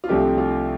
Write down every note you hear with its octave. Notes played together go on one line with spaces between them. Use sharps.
F4
C2 C3 F3 A3 D4 G4
F4